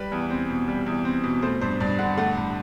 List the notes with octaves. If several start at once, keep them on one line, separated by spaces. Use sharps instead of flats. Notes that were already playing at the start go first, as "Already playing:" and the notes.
Already playing: G3 B4
E2
C4
B2
G3
E2
C4
B2
A3 C5
G2 C5
G2 D5
D3 F#5
A3 F#5
G2